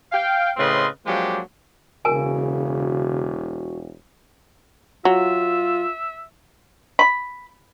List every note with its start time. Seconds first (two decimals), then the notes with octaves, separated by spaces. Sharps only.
0.12 F5 G5
0.57 A2 C#3 C4 B4 D#5 C6
1.06 F3 F#3 G#3 A#3 D4 G4
2.05 E1 C#3 F#4 A#4 G#5
5.05 F#3 F4 E5
6.99 B5